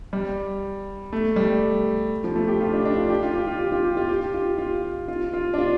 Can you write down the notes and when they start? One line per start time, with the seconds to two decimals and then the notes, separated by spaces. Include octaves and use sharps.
0.13 G3
1.13 A3
1.36 G3
2.24 F3
2.35 A3
2.48 G4
2.61 F4
2.73 D4
2.85 D4
2.98 F4
3.10 G4
3.23 F4
3.34 G4
3.47 F4
3.59 G4
3.72 F4
3.84 G4
3.97 F4
4.09 G4
4.34 F4
4.58 F4
5.08 F4
5.34 F4
5.54 D4
5.58 F4